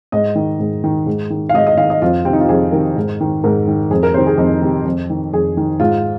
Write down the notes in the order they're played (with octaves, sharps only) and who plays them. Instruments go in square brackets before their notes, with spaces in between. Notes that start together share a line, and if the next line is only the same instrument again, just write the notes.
[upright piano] G#2 D#5
D#3
G#2
D#3
G#2
D#3
F5
G#2 D#5
D#5
D#3 F5
D#5
F2 F4
C3 C4
D#3 D#4
F4
F2 G#4
C3 D#3 A#4
G#2
D#3
G#2 A#4
D#3
F2 G#4
A#4
C3 D#3 C5
G#4
F2 D#4
C3 D#3
F2
D#3
F2 G#4
D#3
G#2 F4